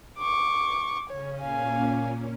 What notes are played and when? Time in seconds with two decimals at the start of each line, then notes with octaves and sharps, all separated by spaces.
0.18 C#6 D6
1.09 C#3 C#4 C#5
1.41 A#2 A#3 C#4 F5 G#5